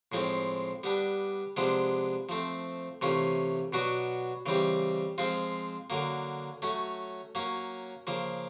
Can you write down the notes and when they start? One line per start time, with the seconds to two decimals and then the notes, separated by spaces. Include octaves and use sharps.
0.12 A2 F3 G#3 C4
0.83 G3 B3 D4
1.57 C3 F3 G#3 B3 D4
2.29 F3 A3 C4
3.01 C3 E3 A3 C#4 F4
3.73 B2 F#3 B3 D4 F#4
4.46 C#3 E3 G3 C4
5.18 F3 G#3 C4 F4
5.90 D3 F#3 A#3
6.62 F#3 A3 C#4
7.35 F#3 A#3 C#4
8.07 C#3 F3 A#3